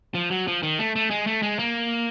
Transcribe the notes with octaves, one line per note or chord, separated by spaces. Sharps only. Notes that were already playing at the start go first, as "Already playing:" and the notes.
F3
F#3
F3
D#3
A3
A3
G#3
A3
G#3
A#3